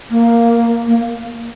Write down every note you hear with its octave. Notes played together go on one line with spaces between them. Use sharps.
A#3
A#3